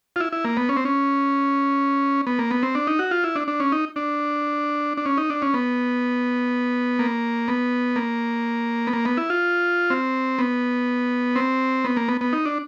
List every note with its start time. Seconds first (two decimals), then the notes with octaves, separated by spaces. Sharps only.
0.16 F4
0.20 E4
0.33 E4
0.45 A#3
0.57 B3
0.69 C#4
0.77 C4
0.85 C#4
2.27 B3
2.39 A#3
2.51 B3
2.63 C4
2.75 D4
2.87 D#4
2.99 F#4
3.11 F4
3.24 E4
3.36 D4
3.48 D4
3.60 C#4
3.72 D#4
3.96 D4
4.97 D4
5.05 C#4
5.18 D#4
5.30 D4
5.42 C#4
5.54 B3
6.99 A#3
7.48 B3
7.96 A#3
8.87 B3
8.93 A#3
9.05 B3
9.17 E4
9.30 F4
9.90 C4
10.39 B3
11.36 C4
11.85 B3
11.96 A#3
12.08 B3
12.21 B3
12.33 D#4
12.46 D4